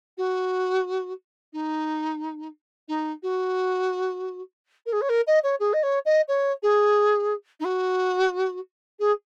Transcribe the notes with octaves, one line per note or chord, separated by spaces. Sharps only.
F#4
D#4
D#4
F#4
A#4
G#4
C#5
A#4
D#5
C#5
G#4
D#5
C#5
D#5
C#5
G#4
D#4
F#4
G#4